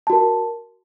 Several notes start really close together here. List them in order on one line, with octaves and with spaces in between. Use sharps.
A5 F#4 A#4